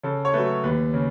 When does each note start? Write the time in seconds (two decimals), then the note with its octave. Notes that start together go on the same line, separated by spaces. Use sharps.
0.03 C#3 A4
0.25 C#5
0.34 F#3 A3 B4
0.64 D#2 B4
0.94 C#3